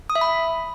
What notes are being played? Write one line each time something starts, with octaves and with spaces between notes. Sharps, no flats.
D#6
E5
B5